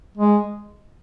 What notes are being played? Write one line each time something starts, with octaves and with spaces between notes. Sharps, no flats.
G#3